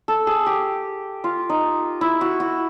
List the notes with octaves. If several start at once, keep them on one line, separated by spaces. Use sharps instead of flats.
A4
G#4
G4
F4
D#4
E4
F#4
F#4